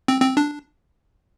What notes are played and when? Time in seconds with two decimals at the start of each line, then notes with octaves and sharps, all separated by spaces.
0.08 C4
0.22 C4
0.37 D4